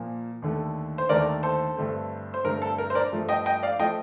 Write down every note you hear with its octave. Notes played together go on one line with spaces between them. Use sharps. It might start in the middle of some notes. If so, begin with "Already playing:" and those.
Already playing: A#2 F3 A#3
D#2 D3 A3
C5
D#2 D3 A3 A#4 D5
A4 C5
G2 D3 A3 C4
C5
G2 D3 A3 C4 A#4
A4
A#4
C5
A#4 D5
G2 F3 A3
D#5 G5
D#5 G5
D5 F5
F3 A3 D#5 G5